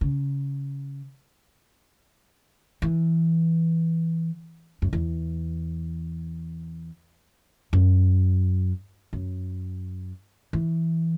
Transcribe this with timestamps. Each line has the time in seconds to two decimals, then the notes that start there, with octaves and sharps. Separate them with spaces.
0.01 C#3
2.82 E3
4.82 F#2
4.93 E2
7.73 F#2
9.13 F#2
10.53 E3